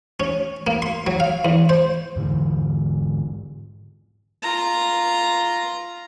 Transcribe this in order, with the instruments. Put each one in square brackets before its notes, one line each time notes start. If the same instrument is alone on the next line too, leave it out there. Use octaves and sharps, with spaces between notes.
[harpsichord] C#4
A#3
C6
F#3
F5
E2
C5
[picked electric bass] G#2 D3 E3 G#3
[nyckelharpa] F4 A#5